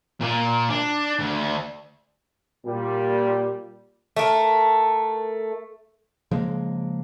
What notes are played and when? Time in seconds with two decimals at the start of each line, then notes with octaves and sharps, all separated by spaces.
0.21 A#2
0.70 D4
1.19 D2
2.66 A#2 G3
4.16 A3 A#4
6.31 C#3 F3 G#3 A#3